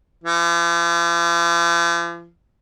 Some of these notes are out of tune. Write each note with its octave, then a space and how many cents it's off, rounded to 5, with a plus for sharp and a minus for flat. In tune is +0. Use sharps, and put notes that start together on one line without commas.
F3 -45